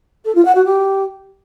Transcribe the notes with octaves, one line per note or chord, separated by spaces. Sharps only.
A4
F4
F#5
F#4
G4